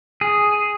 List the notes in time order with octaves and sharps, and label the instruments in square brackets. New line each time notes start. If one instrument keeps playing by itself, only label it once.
[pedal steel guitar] G#4